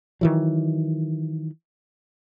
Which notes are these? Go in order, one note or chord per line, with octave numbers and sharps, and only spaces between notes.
D#3 E3 F#3